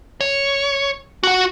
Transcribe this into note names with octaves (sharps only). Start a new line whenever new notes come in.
C#5
F#4 F#5